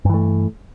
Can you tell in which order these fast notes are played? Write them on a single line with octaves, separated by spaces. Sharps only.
G2 E3 A3